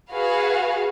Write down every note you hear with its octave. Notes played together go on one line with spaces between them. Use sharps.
F#4 G#4 B4 F5